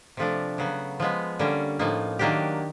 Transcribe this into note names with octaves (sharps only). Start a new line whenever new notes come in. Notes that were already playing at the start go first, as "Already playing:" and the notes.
C3 F3 A3 D4
C#3 F#3 B3
F3 G#3 B3
D3 G3 A#3 C#4
A2 F3 A#3 D#4
D#3 F#3 A#3 D4 G4